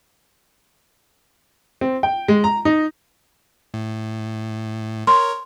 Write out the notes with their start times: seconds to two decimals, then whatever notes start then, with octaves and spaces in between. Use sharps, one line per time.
1.81 C4
2.03 G5
2.28 G#3
2.44 A#5
2.65 D#4
3.74 A2
5.07 A#4 C#5 C6